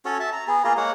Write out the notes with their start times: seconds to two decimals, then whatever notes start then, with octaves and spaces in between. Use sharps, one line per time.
0.05 C#4 F#4 A4 C#5
0.20 E5 A5
0.32 A#5
0.47 B3 G#4
0.64 A#3 F4 G#4 A#5
0.77 G#3 A#3 C#5 F#5